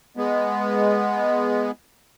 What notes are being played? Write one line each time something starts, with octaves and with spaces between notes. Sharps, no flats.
G#3 B3